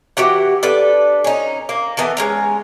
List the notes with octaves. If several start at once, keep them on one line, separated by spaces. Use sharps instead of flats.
E3 F#4 G4 F#5
D4 A4 B4
C#4 D#4
A#3
E3 B3 A4 A#4
G#3 C#4 A#5